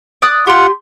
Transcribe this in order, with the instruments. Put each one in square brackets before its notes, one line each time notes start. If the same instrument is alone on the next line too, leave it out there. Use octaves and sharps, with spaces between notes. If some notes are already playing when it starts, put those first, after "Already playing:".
[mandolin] D5 D#6 F#6
[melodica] F4 F#5 [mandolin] G4 C6